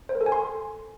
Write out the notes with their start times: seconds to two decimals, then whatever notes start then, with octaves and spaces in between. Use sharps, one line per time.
0.09 C5
0.15 A#4
0.21 A4
0.26 G#5
0.32 C6